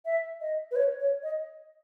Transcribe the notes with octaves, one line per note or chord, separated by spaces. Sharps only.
E5
D#5
B4
C#5
C#5
D#5